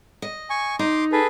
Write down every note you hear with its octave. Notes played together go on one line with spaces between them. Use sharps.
D#5
G#5 C#6
D#4 C6 D6
G#4 A4 B4